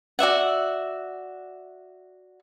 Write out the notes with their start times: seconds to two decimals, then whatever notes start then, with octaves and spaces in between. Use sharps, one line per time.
0.19 F#4 D5 E5 F#5